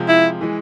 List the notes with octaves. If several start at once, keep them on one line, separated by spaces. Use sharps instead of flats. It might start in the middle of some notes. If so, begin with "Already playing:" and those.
Already playing: C3 F3 G#3
E4
E3 G#3